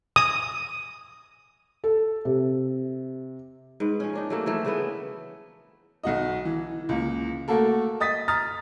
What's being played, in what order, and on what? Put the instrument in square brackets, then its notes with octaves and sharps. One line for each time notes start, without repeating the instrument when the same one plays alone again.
[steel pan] D#6
[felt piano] A4
C3
[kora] G#2 B4
F3 C#4
A#3 D4 D#4
F#3 A3 A#3
E3 F3 A3
C#3 E3 A3 B3
[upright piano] B1 F#4 D#5
E3
C#2 A#3
A3 A#3 F#4 A4 A#4
D#5 D#6 A6 B6
A#5 D#6 F6 A6